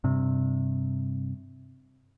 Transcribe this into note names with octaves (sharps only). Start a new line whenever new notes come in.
G2 C3